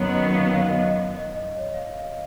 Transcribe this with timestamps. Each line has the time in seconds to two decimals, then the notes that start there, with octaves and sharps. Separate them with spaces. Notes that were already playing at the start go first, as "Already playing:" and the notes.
Already playing: F#2 D#3 F#3 B3 C#5
0.14 D#5
0.34 F5
0.54 F5
0.70 D#5
0.86 D#5
1.01 D#5
1.17 D#5
1.37 D#5
1.58 C#5
1.74 F5
1.78 D#5
1.99 F5